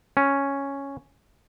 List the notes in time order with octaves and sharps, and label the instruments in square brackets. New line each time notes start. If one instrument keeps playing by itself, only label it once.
[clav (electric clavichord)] C#4